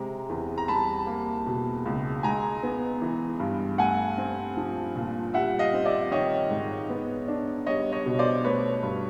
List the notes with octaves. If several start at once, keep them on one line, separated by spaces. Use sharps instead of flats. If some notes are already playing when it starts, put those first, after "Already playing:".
Already playing: C3 G#3 A#5
E2
A#5
G3 A5 B5
A#3
B2
C#2
G#3 G#5 A#5
B3
E3
G2
A3 F#5 G#5
C4
F3
A#2
G3 E5 F#5
D#5 F5
C4
D5 E5
D#3 C#5 D#5
G#2
B3
D4
G3 C#5 D#5
C#5 D#5
B2
C5 D5
A3 B4 C#5
G2